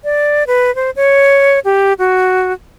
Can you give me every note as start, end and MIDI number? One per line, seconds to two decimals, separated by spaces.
0.04 0.44 74
0.47 0.74 71
0.76 0.90 72
0.96 1.59 73
1.65 1.93 67
1.99 2.53 66